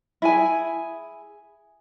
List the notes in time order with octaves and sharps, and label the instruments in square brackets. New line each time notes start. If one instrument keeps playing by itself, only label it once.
[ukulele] E4 G#4 G#5